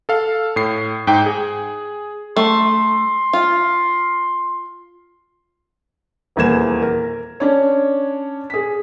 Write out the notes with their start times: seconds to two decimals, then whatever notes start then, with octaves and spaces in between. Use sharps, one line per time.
0.09 A4 F5
0.56 A2 C7
1.07 G#2 G5
1.26 G#4
2.36 A3 C6
3.33 F4
6.36 D#1 E2 A#3 G#6 E7
6.82 A#4
7.40 C#4 D4 C#5
8.50 G#4 B6